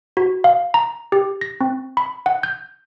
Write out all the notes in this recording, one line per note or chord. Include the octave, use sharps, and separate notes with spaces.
F#4
F5
A#5
G4
A#6
C4
B5
F#5
G6